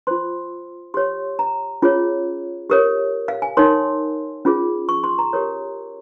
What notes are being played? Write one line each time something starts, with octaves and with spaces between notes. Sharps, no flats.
F4 C5 C6
G4 C#5 C6
A#5
C#4 F4 G#4 C#5
G4 A#4 C#5
F5
G#5
D#4 A#4 C#5 C6
C#4 F4 G#4
C#6
C6
A#5
G4 A#4 C#5